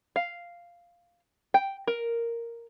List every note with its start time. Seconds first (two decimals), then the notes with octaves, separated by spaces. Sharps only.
0.16 F5
1.54 G5
1.87 A#4